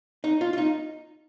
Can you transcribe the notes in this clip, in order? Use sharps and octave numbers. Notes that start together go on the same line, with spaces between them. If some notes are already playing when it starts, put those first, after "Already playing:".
D#4
F4
F4
D#4